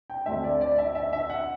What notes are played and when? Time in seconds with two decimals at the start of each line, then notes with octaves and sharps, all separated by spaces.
0.10 G5
0.26 D2 D3 A3 C4 E5
0.44 D5
0.61 D5
0.78 E5
0.95 E5
1.13 E5
1.30 F#5